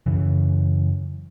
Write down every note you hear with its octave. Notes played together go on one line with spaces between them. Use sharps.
F#2 C#3 E3